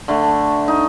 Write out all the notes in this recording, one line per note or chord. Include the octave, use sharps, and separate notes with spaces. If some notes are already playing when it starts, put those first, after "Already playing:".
D3 A3
D#4